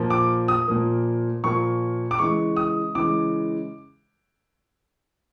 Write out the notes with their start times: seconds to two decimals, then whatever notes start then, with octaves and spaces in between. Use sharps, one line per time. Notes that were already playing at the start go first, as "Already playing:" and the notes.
Already playing: A#2 F3 A#3
0.10 D6
0.48 D#6
0.67 A#2 F3 A#3
1.44 A#2 F3 A#3 C#6
2.11 D6
2.19 C#3 E3 G#3 C#6
2.57 D#6
2.95 C#3 E3 G#3 D6